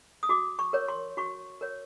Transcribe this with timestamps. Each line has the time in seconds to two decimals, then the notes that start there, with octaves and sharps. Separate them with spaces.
0.23 D#6
0.29 F#4 D6
0.59 C#6
0.73 A#4 C#5
0.88 C6
1.17 F#4 C#6
1.61 A#4 C#5